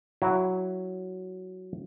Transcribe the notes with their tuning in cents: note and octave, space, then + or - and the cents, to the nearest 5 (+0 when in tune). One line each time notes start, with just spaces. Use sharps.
F#3 +0 E4 +0